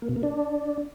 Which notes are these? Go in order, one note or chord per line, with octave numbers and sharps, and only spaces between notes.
A#3
B2
A#3
D4